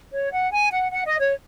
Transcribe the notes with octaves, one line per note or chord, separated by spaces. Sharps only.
C#5
F#5
G#5
F#5
F#5
D#5
C#5